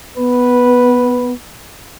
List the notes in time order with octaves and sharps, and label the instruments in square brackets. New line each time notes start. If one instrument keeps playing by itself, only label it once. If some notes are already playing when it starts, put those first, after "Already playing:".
[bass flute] B3 [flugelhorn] B4